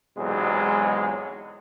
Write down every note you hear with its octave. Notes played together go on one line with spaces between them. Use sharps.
B1 E2 G#2 C3 F#3 G#3